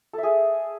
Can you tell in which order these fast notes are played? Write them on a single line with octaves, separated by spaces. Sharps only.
A4 E5 G#4